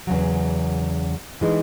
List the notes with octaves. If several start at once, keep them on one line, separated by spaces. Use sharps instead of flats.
E2 C#3 F#3
E3 G#3 D#4